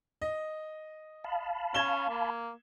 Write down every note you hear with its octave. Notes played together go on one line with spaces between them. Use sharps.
D#5
F5 A5 B5
C#4 G#6 E7 G7
A#3